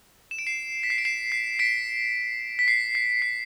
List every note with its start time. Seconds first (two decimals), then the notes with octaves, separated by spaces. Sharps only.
0.31 E7
0.39 D7
0.47 C7 E7
0.83 B6
0.90 C7
0.98 D7
1.05 C7 E7
1.32 C7
1.59 B6 D7
2.59 B6
2.68 C7
2.95 C7
3.22 C7